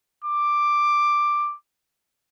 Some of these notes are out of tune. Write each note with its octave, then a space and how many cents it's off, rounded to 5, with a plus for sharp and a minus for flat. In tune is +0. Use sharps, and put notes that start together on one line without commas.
D6 +5